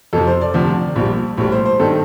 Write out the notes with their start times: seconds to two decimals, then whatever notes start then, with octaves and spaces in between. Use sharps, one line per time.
0.13 F2 C3 F3 A4
0.27 C5
0.41 D5
0.54 D2 C3 F3
0.96 A#1 A#2 G3
1.37 A#1 A2 G3
1.52 C5
1.66 C5
1.80 G2 D#3 G3 A4